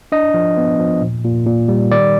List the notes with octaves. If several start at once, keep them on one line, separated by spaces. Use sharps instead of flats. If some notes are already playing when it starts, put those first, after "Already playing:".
D4 D#5
F3
B3
F3
A#2
A#2
A#2
G3
D#3 D5